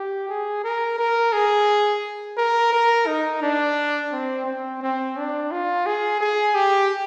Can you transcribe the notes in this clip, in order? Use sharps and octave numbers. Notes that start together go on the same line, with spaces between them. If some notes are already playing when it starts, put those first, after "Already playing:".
Already playing: G4
G#4
A#4
A#4
G#4
A#4
A#4
D#4
D4
C4
C4
C4
D4
F4
G#4
G#4
G4